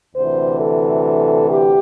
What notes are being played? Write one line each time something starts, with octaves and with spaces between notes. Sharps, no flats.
D2 C3 E3 C5
A4
G4